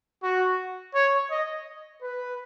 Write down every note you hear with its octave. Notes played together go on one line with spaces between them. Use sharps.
F#4
C#5
D#5
B4